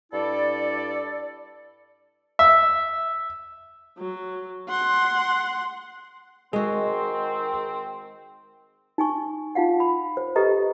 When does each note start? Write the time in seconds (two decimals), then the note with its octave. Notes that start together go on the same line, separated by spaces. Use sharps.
0.13 G2 E4 A4 D5
2.39 E5
3.98 F#3
4.69 F#5 C6
6.53 D#3 G#3 C4 F#4 G#4
8.98 D#4 G#5 C#6
9.55 D#4 F4 F5 F#5
9.80 B5
10.17 C5
10.36 G4 A4 B4 D#5 A#5